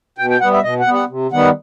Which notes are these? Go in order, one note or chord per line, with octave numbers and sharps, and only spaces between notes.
B2 G5
G5
G3 B3 F#5
E5
B2 D#5
F#5
G3 B3
F#5
C3
D#3 G3 B3 F#5